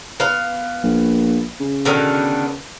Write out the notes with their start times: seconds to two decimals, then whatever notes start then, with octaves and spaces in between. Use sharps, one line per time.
0.20 B3 F5
0.83 A#1
1.61 C#3
1.85 B2 D3 D#3